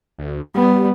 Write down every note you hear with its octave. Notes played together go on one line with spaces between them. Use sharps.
D2
G3 B3